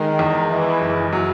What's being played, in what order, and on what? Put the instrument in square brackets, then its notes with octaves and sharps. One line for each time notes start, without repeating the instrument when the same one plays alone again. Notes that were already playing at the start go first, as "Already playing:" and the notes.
Already playing: [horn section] D#3 [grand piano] G#3
[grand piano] E2
[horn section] E3 [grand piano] G#3
[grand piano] F#1
F#3